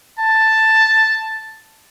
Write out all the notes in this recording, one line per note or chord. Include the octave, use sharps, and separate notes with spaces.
A5